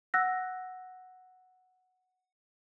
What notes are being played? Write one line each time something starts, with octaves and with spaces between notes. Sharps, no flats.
F#5 E6 F#6 A#6